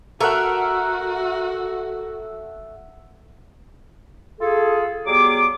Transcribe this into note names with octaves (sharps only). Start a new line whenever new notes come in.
A3 F#4 A#4 E5 F#5
F4 G#4 A4
F#3 G3 B3 G#4 D6